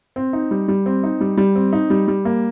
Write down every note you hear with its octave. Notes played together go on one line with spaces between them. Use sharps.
C4
D#4
G3
G3
C4
D#4
G3
G3
C4
D#4
G3
G3
A#3